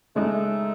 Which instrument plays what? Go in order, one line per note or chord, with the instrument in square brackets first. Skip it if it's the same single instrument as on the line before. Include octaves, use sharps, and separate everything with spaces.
[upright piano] C#3 G#3 D#4 [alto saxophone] A3